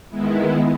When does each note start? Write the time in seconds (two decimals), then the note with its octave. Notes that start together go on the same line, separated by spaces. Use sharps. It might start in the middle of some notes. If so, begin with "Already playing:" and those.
0.10 D#3 G#3 B3 E4